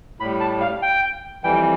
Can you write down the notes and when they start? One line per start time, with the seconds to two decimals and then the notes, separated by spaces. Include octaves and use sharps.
0.19 A2 B5
0.24 G3
0.40 A5
0.61 F5
0.82 G5
1.44 F2 E3 G3 G5